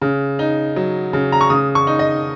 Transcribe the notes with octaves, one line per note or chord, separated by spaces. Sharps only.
C#3
D#4
F#3
C#3
A#5
C#6
C#3 D#6
C#6
D#4
D#5